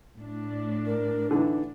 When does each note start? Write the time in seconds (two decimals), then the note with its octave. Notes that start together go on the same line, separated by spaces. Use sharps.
0.18 A2 D4
0.86 A#4
1.31 D3 E3 D#4